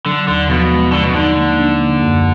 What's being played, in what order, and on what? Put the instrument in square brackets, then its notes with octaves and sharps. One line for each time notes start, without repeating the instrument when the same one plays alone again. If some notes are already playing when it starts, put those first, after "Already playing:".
[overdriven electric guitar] D3 [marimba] F#3
[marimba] D#2 [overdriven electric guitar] D3
[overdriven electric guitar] B2 [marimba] F3
[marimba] G#3
[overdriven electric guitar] D3 [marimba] G#3
[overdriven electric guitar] B2
[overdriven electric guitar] D3 [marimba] D#4
[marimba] A#3
D4
A#3
F#2